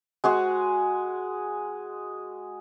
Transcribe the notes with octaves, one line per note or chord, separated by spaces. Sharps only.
G#3 F#4 G#4